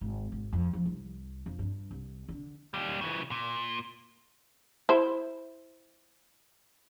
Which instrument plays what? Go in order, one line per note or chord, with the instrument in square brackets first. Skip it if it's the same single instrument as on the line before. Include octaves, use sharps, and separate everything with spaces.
[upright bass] G#1
G#1
F2
F3
C2
F2
G2
C2
D3
[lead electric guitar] D#2 G3
C#3 E3
A#2
[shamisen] E4 C5